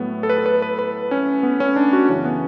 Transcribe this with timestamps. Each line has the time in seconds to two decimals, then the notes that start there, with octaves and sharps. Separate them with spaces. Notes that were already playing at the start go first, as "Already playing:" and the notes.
Already playing: A2 F#3 A3 B3
0.23 A4
0.29 B4
0.38 A4
0.46 B4
0.62 B4
0.79 B4
1.11 C#4
1.43 B3
1.60 C#4
1.76 D4
1.93 F#4
2.09 F#2 C#3 E3 C#4
2.25 B3